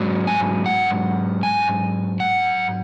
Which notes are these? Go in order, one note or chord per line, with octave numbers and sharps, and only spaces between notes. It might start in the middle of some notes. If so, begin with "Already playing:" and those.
Already playing: G#2 F#3
G#5
F#5
G#5
F#5